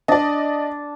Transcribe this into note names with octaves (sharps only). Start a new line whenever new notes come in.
D4 D5 D#5